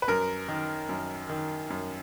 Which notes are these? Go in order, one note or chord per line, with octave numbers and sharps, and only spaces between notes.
B4
F#2 A#4
D#3
F#2
D#3
F#2